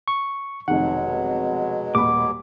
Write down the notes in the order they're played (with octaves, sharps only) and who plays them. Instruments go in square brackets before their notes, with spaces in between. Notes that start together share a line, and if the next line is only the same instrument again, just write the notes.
[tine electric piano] C#6
[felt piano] F1 D#3 [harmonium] B2 F#3 G#3 [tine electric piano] F#5
[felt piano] D#1 B5 [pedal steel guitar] D6